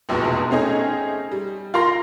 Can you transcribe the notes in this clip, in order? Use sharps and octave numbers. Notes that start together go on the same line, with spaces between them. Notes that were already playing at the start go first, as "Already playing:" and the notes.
F1 A#1 E2 B2 G#3
A3 C4 C#4 D#4 G#4
G3
F4 A#4 C6 A#6